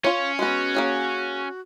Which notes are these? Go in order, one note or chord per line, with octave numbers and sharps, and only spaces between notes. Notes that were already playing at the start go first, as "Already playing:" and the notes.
C#4 F4 C#5
G#3 B3 F#4
A#3 G#4 C#5